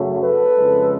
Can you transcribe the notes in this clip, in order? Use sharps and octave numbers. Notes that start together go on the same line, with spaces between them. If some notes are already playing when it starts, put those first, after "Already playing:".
Already playing: F#2 C#3 F#3 A3
A4 B4
F2 C#3 F3 G#3